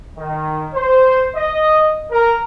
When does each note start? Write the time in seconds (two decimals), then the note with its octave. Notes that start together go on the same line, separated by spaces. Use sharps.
0.18 D#3
0.74 C5
1.36 D#5
2.11 A#4